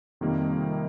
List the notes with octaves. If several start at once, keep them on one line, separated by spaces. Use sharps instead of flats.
F2 C3 D#3 G3 A#3